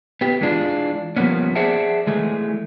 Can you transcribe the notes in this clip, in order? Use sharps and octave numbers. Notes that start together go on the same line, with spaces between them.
B3 G4
E3 G#3 D4 F4
F3 G3 A#3 B3 C#4
G#4 C5 D5 E5 F#5 A5
E3 G#3 A3